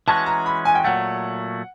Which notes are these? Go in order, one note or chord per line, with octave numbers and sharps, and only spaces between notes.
E3 G#3 C#4 F#4 A5
A#5
B5
G#5
G5
A#2 F#3 A3 F#5